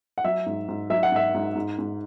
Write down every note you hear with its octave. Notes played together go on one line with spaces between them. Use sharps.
F#5
F#3 E5
G#2
G#2
F#3 E5
F#5
G#2 E5
G#2
G#2
G#2